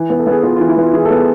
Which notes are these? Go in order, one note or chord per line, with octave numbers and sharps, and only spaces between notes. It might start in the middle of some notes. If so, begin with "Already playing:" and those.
Already playing: E3
B3
A4
B3 G#4
B3 F4
E3 F4
E4
B3 F4
E3 G#4
A4
B3
G#4